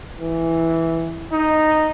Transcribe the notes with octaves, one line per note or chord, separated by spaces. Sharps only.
E3
D#4